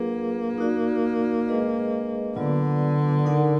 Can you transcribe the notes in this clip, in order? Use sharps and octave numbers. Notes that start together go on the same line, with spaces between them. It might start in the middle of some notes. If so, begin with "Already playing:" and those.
Already playing: F#3 A#3 D4 F4 G#4 B4
D#4 F#4 D5
G#3 D4 G#4 B4 D#5
D3 F#3 B3 F4 B4 D5
D#4 A#4 D5 F#5